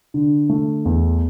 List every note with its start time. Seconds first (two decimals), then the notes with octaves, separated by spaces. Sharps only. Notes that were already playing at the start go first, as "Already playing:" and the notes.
0.14 D3
0.50 A3
0.85 E2